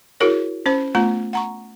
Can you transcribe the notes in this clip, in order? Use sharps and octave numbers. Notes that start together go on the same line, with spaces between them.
E4 F#4 G#4 A#4 C#5
C#4 C5 B5
A3 B3 F4 A#5
F#5 A#5 C#6